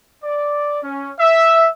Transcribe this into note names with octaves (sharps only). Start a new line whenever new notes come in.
D5
C#4
E5